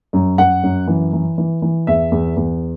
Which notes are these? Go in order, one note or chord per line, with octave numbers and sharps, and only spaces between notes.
F#2
F#2 F#5
F#2
E3
E3
E3
E3
E2 E5
E2
E2